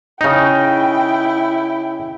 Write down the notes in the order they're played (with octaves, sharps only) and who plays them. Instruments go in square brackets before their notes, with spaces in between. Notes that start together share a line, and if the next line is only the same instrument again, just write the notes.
[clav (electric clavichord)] C#3 D#4 [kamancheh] E4 G5